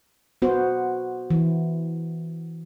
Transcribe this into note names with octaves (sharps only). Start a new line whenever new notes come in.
B3 F#4 C5
E3